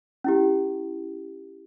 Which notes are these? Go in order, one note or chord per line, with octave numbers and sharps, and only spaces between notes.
C#4 E4 G4